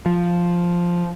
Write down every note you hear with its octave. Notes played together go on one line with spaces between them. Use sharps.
F3